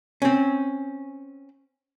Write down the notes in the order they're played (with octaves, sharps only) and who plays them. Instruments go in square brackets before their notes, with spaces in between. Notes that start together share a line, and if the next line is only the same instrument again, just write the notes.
[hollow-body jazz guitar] C4 C#4